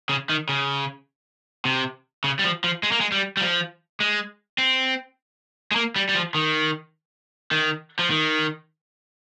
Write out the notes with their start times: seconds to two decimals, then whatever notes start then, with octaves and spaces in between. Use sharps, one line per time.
0.09 C#3
0.29 D#3
0.49 C#3
1.65 C3
2.24 C#3
2.39 G3
2.44 F3
2.64 F3
2.83 G#3
2.92 A#3
3.01 G#3
3.12 G3
3.37 G3
3.42 F3
4.00 G#3
4.58 C4
5.72 G#3
5.76 A#3
5.96 G3
6.09 G3
6.15 F3
6.35 D#3
7.51 D#3
7.99 F3
8.10 D#3